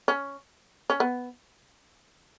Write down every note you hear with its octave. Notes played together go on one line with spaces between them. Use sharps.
C#4
C#4
B3